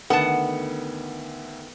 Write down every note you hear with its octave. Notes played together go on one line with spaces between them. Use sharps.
D2 D#3 B3 A4 F#5 A5